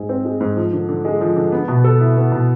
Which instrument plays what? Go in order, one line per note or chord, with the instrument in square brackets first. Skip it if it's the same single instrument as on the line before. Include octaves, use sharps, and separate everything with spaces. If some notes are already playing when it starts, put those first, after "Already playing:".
Already playing: [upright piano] G#2 G#3 G#4
C4
G#3
G#2
F3
D3
D3
G#3
F3
D3
B3
B2
A4
E4
B3
B2